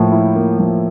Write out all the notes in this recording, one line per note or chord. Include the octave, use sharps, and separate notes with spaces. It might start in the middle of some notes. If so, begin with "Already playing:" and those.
Already playing: A2 F3 A#3
E4
A#3
F3